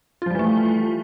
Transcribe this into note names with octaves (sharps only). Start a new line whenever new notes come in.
E3 F3 G3 A3 F4